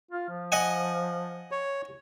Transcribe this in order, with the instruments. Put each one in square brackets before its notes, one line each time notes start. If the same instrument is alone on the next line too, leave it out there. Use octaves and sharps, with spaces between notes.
[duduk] F4
F3
[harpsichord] D#5 F#5 G#5
[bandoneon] C#5